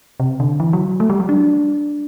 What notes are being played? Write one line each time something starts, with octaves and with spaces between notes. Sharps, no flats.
C3
D3
E3
F#3
A3
G3
F#3
D4